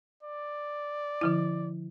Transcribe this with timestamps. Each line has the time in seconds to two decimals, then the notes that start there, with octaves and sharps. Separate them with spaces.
0.23 D5
1.21 D3 F3 E4